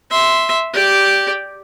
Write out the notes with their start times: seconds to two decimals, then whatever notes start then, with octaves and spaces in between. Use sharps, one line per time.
0.11 E5 C6
0.74 G4 D5